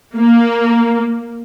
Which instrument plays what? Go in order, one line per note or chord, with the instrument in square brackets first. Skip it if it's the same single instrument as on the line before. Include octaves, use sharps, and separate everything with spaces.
[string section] A#3